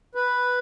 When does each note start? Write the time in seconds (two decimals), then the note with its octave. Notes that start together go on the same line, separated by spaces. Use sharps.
0.15 B4